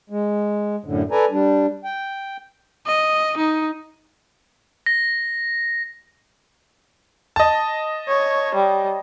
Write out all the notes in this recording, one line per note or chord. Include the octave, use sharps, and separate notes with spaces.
G#3
F#2 A2 D3
A4 B4 D5 G#5 A#5
G3 D4
G5
D#5
D#4
A#6
D#5 A5
C#5
G3